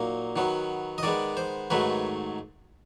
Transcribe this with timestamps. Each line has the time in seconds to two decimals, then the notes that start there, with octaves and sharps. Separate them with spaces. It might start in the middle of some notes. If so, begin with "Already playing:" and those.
Already playing: A#2 F#3 A#3 D#4
0.36 D#3 F#3 B3
0.98 D#5
1.03 D#3 G#3 B3 D5
1.37 C5
1.70 G#2 D#3 F#3 A3 B4